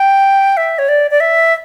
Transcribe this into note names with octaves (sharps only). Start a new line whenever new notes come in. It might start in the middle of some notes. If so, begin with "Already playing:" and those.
Already playing: G5
E5
C#5
D5
D5
E5